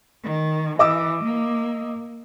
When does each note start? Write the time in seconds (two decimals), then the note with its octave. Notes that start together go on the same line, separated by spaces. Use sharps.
0.24 D#3
0.79 E3 D#5 D6 E6
1.24 A#3